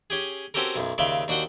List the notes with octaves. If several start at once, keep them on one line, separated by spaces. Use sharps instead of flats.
C#4 G4 G#4
C4 C#4 F#4 G4 A4 A#4
B1 F#2
D#2 C#3 D5 E5 F5 C6
D#2 D4 F#4 F#5 G5